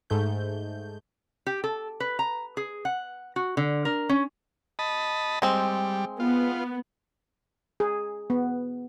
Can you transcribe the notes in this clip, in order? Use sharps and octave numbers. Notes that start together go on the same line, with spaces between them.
G#2 A3 G6
G4
A4
B4
A#5
G#4
F#5
F#4
D3
A#4
C#4
D#5 A5 B5
G3 G#3 C4
B3 F4
G#4
B3